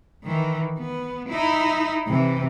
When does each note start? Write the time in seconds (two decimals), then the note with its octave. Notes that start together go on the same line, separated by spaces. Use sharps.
0.24 D#3 E3
0.78 B3
1.29 D#4 E4
2.07 C3 E3